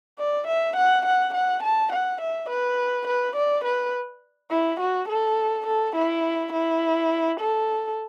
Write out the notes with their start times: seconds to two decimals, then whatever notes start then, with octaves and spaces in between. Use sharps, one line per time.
0.19 D5
0.47 E5
0.77 F#5
1.06 F#5
1.35 F#5
1.63 A5
1.93 F#5
2.22 E5
2.49 B4
3.07 B4
3.36 D5
3.65 B4
4.51 E4
4.80 F#4
5.09 A4
5.67 A4
5.96 E4
6.53 E4
7.40 A4